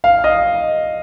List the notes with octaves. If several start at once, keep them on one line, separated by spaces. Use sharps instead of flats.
F5
D#5